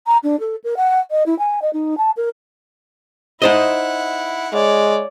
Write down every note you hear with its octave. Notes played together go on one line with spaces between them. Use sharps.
A#5
D4
A4
A#4
F#5
D#5
E4
G#5
D#5
D#4
A5
A#4
D#4 E4 C5 D#5 F#5
G#3 C#5 D5